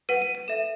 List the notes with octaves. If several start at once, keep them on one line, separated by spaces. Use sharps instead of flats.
B4 F#5 D#7
D#7
D#7
A4 E5 E7